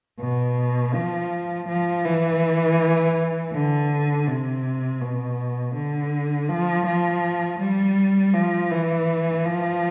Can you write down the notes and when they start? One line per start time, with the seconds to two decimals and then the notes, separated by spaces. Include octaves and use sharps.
0.20 B2
0.94 F3
1.68 F3
2.05 E3
3.53 D3
4.27 C3
5.01 B2
5.75 D3
6.49 F3
6.86 F3
7.60 G3
8.34 F3
8.72 E3
9.45 F3